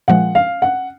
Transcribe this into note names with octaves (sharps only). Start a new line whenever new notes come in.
A#2 F3 G#3 F#5
F5
F#5